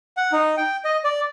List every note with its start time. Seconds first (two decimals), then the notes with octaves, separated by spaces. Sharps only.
0.17 F#5
0.32 D#4
0.57 G5
0.85 D#5
1.04 D5